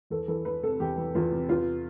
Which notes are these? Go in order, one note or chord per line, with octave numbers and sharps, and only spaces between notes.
E2 A4
E3 A4
E2 B4
C3 A4
E2 G4
E3
E2 F4
C3
E2 F4